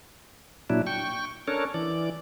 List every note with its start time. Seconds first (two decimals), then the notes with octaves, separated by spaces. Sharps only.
0.70 A#2 F#3 D4 E4
0.87 G5 C#6
1.48 C#4 D4 A4 A#4 C#5
1.74 E3 D5